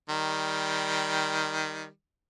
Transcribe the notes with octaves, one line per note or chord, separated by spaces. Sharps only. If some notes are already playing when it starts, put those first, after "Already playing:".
D#3 G3